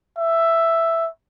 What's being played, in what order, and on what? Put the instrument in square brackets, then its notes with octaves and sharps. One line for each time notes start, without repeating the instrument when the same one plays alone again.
[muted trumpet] E5